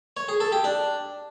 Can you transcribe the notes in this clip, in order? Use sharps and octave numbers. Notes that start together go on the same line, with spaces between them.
C#5
G#4
A4
G4
D4